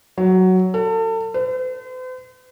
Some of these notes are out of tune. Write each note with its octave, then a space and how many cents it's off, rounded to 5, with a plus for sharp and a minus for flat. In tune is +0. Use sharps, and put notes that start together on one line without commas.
F#3 +5
A4 +35
C5 -45